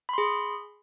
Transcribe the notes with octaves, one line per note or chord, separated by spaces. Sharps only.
G#4 B5 C6